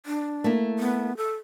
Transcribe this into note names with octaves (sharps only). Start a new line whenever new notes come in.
D4
A3 A#3 E4
B3
A4